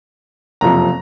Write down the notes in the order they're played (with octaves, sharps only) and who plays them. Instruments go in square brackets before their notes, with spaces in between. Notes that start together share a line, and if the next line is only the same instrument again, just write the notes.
[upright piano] F#1 F2 C3 F3 A#5